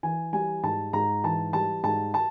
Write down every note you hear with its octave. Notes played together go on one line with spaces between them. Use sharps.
E3 G#5
G3 G#5
G#2 A5
G#2 A#5
E3 A5
G3 A5
G#2 A5
A5